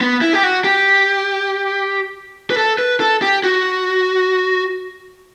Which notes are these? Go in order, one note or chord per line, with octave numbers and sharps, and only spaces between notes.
B3
E4
G4
F#4
G4
B4
A4
B4
A4
G4
F#4